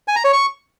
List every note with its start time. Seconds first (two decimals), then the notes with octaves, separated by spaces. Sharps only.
0.08 G#5
0.16 A#5
0.24 C#5
0.33 C#6